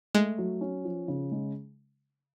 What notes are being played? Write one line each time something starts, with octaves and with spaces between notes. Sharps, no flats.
G#3 A3
F#3
C#4
F3
C#3
G#3